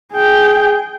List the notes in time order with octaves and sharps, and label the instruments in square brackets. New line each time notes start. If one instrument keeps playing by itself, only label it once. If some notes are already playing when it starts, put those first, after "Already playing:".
[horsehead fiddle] G#4 G5